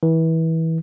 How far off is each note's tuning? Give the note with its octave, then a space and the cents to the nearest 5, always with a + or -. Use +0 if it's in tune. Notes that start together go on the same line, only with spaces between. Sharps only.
E3 -25